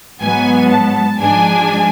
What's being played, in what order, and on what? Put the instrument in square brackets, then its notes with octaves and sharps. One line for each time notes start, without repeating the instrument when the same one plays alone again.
[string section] G#2 F#3 B3 G#5
A5
G#2 F3 G#3 D4 G#5